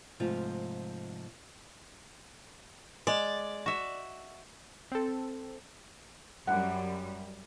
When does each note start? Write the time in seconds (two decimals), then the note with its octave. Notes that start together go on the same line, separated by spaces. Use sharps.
0.20 G#2 C3 F3 A3 F4
3.07 G#3 D5
3.66 F#4 E5
4.92 C4 A4
6.47 F#2 G3 F#5